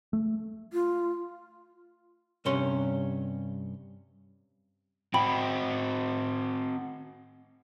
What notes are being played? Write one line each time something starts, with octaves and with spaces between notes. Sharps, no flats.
A3
F4
G2 C3 C#4 C#5 C6
C4 F#4 G5 B5